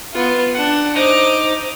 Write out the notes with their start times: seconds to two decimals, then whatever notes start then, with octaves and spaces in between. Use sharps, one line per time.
0.13 B3 F4
0.54 D4 F#5
0.96 D#4 C5 D6